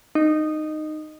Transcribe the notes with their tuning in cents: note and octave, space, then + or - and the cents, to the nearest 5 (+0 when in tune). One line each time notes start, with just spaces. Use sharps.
D#4 -15